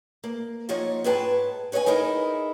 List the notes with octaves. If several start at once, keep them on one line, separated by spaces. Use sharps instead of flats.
A#3
F3 F#3 A#3 D#4 C#5 D#5
G#2 G#4 B4 C#5 G5 A5
B4 C#5 D#5 E5 G#5
G#3 D#4 E4 A#4 D#5